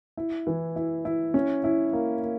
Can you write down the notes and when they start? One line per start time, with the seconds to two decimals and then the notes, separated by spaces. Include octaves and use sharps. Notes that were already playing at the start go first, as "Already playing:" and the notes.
0.17 E4
0.47 E3
0.76 E4
1.05 E4
1.34 C#4
1.64 E4
1.93 A#3
2.23 A#3